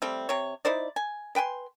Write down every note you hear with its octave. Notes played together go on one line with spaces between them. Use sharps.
G3 A3 C4
C3 C#5
D#4 E4 C5 D5
G#5
B4 G5 G#5 C6